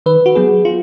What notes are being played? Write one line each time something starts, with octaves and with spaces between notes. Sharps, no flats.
D#3 B4
F#4
F#3 B3 G#4
F4